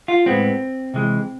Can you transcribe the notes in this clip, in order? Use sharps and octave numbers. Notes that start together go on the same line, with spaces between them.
F4
A2 G#3 B3 C4
C3 E3 G#3